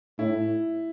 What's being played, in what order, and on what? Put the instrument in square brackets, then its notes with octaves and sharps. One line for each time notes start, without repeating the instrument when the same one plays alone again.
[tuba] A2 [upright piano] E4